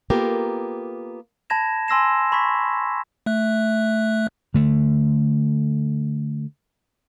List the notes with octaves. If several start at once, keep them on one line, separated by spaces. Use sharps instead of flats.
A#3 B3 F4 G4 A4 A#4
A5 B5 G#6 A#6 E7
G#5 C6 E6 A#6 C7 E7
B5 C#6 G#6 B6
A3 E5 F#6
D3 A3